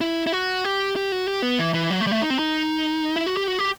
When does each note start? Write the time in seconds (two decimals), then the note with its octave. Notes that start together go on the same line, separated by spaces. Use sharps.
0.01 E4
0.27 E4
0.32 F#4
0.64 G4
0.96 G4
1.12 F#4
1.28 G4
1.42 B3
1.59 E3
1.74 E3
1.91 F#3
2.01 A3
2.07 G3
2.11 A3
2.22 D#4
2.30 C4
2.39 D#4
3.16 E4
3.26 F#4
3.37 G4
3.48 F#4
3.59 G4